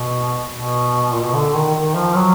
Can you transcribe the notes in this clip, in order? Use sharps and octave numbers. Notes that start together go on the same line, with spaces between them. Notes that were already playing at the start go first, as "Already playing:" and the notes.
Already playing: B2
B2
A#2
B2
D3
D#3
D#3
F3
F#3